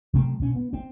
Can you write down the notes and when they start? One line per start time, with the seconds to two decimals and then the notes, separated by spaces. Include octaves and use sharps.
0.13 C3 F#3 A3 C4
0.39 B2 C#4
0.55 B3
0.73 C4